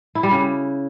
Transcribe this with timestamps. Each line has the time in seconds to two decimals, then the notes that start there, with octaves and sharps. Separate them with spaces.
0.15 E4
0.23 G3
0.31 C#3